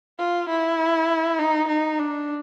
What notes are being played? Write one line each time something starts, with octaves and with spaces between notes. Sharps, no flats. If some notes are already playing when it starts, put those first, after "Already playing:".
F4
E4
D#4
D#4
D4